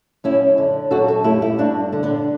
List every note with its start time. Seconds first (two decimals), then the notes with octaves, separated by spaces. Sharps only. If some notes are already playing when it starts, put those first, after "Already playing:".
0.24 F#2 C#4 E4
0.58 D3
0.91 F#2 F#4 A4
1.08 F#4 A4
1.24 A3 E4 G4
1.42 E4 G4
1.58 G2 D4 F#4
1.93 D3
2.03 B3 D4